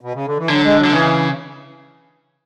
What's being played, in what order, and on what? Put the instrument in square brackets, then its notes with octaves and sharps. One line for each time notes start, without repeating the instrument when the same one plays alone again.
[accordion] B2
C#3
D3
E3
[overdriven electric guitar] D3 [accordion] F#3
[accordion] G#3
F#3
[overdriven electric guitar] D3
[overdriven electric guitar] C#3 [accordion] E3